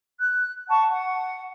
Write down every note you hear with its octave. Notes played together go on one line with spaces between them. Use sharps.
F#6
F#5 A5 C#6
F#5